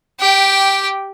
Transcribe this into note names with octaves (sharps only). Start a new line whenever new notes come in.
G4 G5